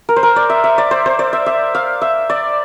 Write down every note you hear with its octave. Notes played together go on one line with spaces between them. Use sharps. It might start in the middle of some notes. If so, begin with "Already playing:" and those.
A#4
C5
A#4
D5
E5
E5
D5
C5
C5
D5
E5
E5
F5
E5
D5